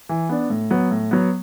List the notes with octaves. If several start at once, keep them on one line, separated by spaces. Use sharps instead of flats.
E3
B3 D4
A2
F#3 B3
A2
F#3 B3